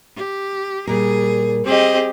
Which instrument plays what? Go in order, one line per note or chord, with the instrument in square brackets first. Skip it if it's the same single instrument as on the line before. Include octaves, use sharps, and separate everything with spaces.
[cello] G4
[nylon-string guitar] A#2 A#4 [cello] G3 G#4
[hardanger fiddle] C4 D#5 [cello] G4 G#4